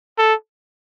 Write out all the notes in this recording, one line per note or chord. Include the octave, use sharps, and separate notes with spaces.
A4